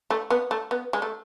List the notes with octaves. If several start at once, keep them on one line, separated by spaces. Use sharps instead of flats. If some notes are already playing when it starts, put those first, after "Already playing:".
A3
B3
A3
B3
G#3
A3